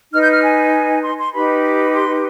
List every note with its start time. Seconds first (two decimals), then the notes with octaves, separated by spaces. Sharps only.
0.13 D#4 B4 F6
0.23 G6
0.33 F6
0.43 G#5
1.03 C6
1.18 C6
1.33 D#4 G4 B4 B5
1.93 C6